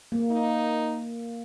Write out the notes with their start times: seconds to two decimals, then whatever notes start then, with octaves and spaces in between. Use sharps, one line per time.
0.12 A#3
0.31 D#4